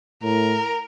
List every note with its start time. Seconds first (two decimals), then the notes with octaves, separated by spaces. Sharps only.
0.23 A2 A#4